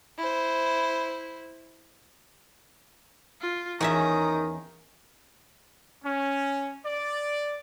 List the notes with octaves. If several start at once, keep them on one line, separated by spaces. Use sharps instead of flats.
E4 C5
F4
E2 D#3 C#4 E5 A#5 D#6
C#4
D5